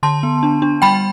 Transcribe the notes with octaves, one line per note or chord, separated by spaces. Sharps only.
D3 A5 C6
B3
D4
D4
G3 G5 B5